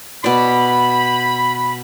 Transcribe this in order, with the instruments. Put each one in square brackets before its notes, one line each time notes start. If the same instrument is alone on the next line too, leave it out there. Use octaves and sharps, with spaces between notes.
[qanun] B2 D5 [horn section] B5